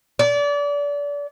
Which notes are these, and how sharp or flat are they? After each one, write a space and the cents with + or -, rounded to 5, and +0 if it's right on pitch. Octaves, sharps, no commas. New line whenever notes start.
D5 -30